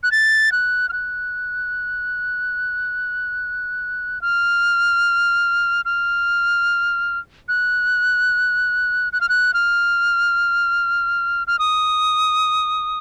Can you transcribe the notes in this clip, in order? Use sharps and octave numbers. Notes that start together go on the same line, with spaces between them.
F#6
A6
F#6
F6
F#6
F6
F6
F#6
F#6
F6
F#6
F6
F6
D#6